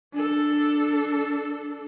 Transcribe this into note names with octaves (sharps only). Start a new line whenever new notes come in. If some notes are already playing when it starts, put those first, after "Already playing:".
D4 A4